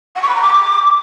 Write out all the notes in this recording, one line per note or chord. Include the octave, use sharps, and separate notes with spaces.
F#5
C#6
B5
A#5
D6